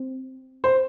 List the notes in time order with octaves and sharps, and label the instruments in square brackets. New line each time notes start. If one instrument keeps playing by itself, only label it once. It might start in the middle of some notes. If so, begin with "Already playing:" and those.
Already playing: [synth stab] C4
[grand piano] C5